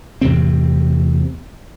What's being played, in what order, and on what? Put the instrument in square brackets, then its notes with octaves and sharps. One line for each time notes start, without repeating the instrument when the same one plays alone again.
[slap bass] E2 A2 C3 C4